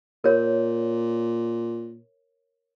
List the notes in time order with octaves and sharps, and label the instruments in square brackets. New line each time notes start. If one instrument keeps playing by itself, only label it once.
[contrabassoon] A#2 [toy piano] A#4 C#5